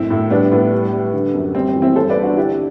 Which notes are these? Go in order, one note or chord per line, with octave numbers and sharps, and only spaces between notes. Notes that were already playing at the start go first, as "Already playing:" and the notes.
Already playing: F#2 A2 C4 E4
A2
G3 B3 D4
A2 B3
G3
G3
D3
F#2
G3 C4
C4
E3
C4 E4
G2 A4 C5
B4 D5
G2
D4 F#4
D3 E4 G4